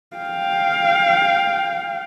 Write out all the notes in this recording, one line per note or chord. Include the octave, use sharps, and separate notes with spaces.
F5 G5